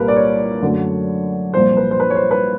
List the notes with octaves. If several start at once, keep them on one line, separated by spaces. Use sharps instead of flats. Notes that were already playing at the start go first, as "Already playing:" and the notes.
Already playing: C2 A#2 G3 A#3 A#4 B4
D5
C#5
F#2 D3 F#3 A3
C2 A#2 F3 C5
B4
C5
B4
C#5
C5
B4